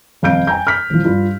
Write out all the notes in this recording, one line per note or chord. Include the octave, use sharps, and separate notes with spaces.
D#1 F2 F5 G6 D7
G5 G#5 A#5 G6
F6 B6
D#1 F3
G2 F4